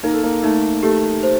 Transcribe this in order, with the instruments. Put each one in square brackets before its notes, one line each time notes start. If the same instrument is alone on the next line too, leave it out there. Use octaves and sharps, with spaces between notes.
[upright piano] A#3 A#4 [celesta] D#4
[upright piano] A4
A#3 A#4
[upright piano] A3 A4 [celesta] D#4
[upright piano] A3 A4 [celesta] G4
[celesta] C5